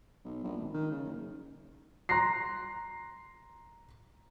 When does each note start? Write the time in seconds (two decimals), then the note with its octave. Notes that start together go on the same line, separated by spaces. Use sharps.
0.25 B1
0.44 A#1
0.57 G#1
0.74 D#3
0.91 C#3
1.05 F#1
2.09 A#5 C6 F#6 A#6 C7